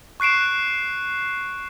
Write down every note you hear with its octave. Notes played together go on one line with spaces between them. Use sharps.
C#6 F#6 C7 D7 E7